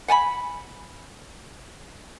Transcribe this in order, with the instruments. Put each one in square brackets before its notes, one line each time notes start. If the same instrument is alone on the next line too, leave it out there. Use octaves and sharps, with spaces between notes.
[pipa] F#5 G#5 A5 B5